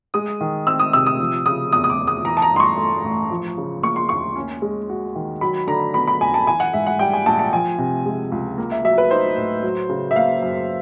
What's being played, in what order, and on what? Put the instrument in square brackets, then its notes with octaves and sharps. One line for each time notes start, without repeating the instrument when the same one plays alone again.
[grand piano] G#3 [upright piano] D#6
[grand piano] D#3
[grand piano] C4 [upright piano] E6
[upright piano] D#6
[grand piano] C3 [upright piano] E6
[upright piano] D#6
[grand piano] F3
[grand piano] C#3 [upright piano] D#6
[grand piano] E2 [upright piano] D#6
[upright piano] D#6
D6
[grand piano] E2
[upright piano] D#6
[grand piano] E3 [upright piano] A#5
[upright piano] A5
A#5
[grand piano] G2 [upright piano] C6
[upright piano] C#6
[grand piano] A3
A1
F3
C#3
[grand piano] A#3 [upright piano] C#6
[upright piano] C6
[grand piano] D#2 [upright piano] C#6
[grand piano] C#4
G#3
F#4
D#3
[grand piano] F#3 [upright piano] B5
[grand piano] D3 [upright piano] A#5
[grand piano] B3 [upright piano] B5
[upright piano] B5
[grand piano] F2 [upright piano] G#5
[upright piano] A5
[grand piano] E3 [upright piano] G#5
[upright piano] F#5
[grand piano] G#2 [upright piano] E5
[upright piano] F#5
[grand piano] G3 [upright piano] G5
[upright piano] G#5
[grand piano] A#1 [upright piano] A5
[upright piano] A5
[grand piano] F3 [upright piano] G#5
[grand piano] C3
G#3
C#2
A#3
[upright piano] E5
[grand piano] F#3 [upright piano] E5
[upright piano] B4
[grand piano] D#4 [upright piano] C5
[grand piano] A2
F#3
C#3
[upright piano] E5
[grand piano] A#3 [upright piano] F5
[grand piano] F#2